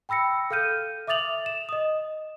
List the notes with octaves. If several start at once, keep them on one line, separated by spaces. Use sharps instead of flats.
G5 B5 E6 A#6 C#7
A4 F5 F6 G6 D#7
E5 D6 D#6 A6 F7 F#7
E7
D#5 D#6